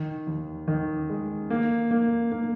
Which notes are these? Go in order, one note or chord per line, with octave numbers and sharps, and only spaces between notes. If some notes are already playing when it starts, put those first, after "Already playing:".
Already playing: D#3
D#2
D#3
G#3
A#3
A#3
A#3